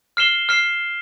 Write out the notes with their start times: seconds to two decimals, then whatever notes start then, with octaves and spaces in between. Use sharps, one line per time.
0.17 F6 C7 E7 G7
0.49 F6 C7 E7